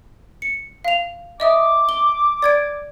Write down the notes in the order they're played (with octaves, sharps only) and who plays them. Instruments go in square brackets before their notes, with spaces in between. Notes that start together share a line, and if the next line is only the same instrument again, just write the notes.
[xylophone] C#7
F5 F7
[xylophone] D#5 E5 D#6 [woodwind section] D6
[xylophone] G7
D5 G#6 D7